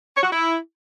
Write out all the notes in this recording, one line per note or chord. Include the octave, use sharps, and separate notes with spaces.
C#5
F#4
E4